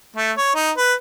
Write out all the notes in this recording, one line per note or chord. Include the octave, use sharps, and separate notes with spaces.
A3
C#5
D#4
B4